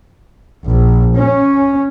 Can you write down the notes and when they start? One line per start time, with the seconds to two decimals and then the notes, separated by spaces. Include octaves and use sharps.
0.66 A#1
1.17 C#4